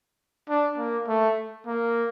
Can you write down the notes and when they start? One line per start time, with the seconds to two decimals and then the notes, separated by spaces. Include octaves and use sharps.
0.49 D4
0.78 A#3
1.08 A3
1.66 A#3